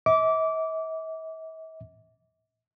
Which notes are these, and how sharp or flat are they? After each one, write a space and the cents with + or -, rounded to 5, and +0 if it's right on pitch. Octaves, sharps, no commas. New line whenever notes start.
E5 -45 D6 -20